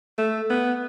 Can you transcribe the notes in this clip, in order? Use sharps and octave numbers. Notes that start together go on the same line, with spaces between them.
A3
B3